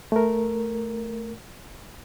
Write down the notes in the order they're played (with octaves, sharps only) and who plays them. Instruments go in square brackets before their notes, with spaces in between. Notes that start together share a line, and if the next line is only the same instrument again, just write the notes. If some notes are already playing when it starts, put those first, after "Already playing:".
[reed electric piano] A3 A#4